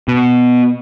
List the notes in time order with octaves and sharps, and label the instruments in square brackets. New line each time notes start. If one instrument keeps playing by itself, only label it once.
[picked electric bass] B2